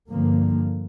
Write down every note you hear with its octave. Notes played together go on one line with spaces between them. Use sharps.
G2 D3 F3 A#3